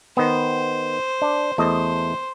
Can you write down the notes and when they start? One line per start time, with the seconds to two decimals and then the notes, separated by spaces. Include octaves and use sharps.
0.17 D#3 B3 C5
1.22 D4
1.58 E2 A3 C5 D#5